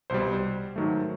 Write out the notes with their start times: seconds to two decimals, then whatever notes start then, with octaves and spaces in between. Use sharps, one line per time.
0.10 C2 B2 G3 C5
0.76 G#2 D#3 F#3 A3